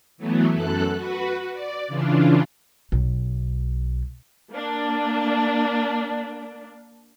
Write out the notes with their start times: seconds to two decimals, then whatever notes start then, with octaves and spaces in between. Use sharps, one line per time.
0.18 E3 F#3 A3 B3
0.51 F#2 A4 F#6
0.94 F#4 B4
1.53 D5
1.88 C#3 E3 D4 F4
2.92 B1
4.50 A#3 D4